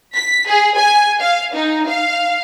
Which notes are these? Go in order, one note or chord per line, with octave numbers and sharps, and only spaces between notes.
B6
G#4
G#5
F5
D#4
F5